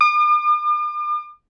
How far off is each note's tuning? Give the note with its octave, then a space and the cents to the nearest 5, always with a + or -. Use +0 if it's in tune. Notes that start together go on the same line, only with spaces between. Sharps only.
D6 +45